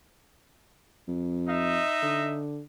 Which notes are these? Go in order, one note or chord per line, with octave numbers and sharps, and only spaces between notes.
F2
D#4 D#5 E5
D3